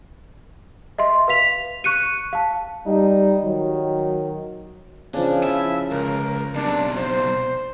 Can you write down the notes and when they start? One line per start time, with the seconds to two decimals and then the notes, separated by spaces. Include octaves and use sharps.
0.98 D#5 E5 C6
1.28 B4 F5 B6 F7
1.84 C#6 F#6 C#7 D#7
2.33 F5 A5
2.86 G3 D#4
3.43 D#3 F#3
5.13 C#3 F3 D4
5.43 E4 E5 A5
5.91 C#2 A#4
6.55 B1 C3 D4
6.97 C5 D5